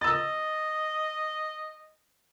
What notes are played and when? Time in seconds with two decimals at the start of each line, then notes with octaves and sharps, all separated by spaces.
0.01 D#5 E6 A6